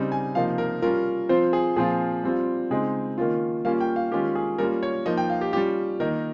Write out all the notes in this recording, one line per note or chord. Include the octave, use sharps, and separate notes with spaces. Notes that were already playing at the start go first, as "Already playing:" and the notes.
Already playing: C#3 G3 C4 D#4
G#5
C3 F3 A#3 D#4 F5
A#4
G3 C#4 F4 A#4
F3 C4 F4 C5
G#4
A#2 F3 C4 F4 G#4
G3 C4 F4
C#3 G#3 C4 D#4 G#4
D#3 A#3 C#4 F4
G3 A#3 C#4 F4 F5
G5
F5
D#3 G#3 C#4 F4 G4
G#4
G3 A#3 C#4 F4 A#4
C#5
F3 A#3 D#4 D#5
G5
F5
G4
G3 C#4 F4 G4
D#3 A#3 D#4 A#4